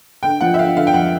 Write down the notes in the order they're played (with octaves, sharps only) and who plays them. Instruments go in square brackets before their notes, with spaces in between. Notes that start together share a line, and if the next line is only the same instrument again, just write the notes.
[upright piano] D3 G5
F3 F#5
E5
D3 F5
D3 F5
G5
F2 F#5